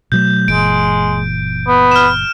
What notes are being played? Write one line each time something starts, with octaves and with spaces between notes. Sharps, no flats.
B2 F#3 A3 G6
F#1 A#2 E3 G#3 D7
B3
F6 E7